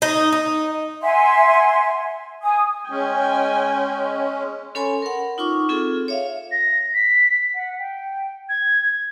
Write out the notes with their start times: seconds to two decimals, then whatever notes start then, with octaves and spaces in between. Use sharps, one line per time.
0.02 D#4
0.32 D#4
1.02 E5 F#5 G#5 C6
2.41 G#5 D#6
2.90 G#3 C#4 G5 G#5
4.75 C#4 A4 C#5 G#5 B5 C6
5.02 A#4 F#5
5.38 D#4 F4 C#6 D6
5.69 C4 F4 G#4 A4
6.08 C#5 E5 F5
6.52 A#6
6.94 B6
7.54 F#5
7.79 G5
8.49 G#6